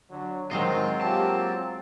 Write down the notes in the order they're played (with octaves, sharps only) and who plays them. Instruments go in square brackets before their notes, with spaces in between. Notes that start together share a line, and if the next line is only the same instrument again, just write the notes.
[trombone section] D3 F#3
[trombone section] D#3 [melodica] F#3 C4 [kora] G#3 C5 D#5 [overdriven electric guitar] F4
[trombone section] A#3 F4 G4 [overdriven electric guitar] A5